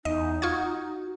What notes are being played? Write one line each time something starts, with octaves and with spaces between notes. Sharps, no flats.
E2 D#4 D#5
F4 F#4 C#6 G#6